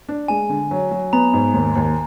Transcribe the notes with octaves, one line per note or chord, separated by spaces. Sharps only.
D4
G#3 G#5
D3
F#3
F#3
B3 A#5
G#2
D#2
D#2